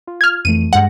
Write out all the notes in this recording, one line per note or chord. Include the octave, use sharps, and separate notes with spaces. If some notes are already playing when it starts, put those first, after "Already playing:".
F4
F6 G#6
F2 E3 A3 D#7
G2 G#3 F#5 A#6